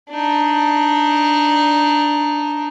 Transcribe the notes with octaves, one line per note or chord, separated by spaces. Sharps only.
D4 D#4